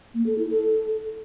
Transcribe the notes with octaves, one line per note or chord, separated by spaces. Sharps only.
A#3
A4
E4
A4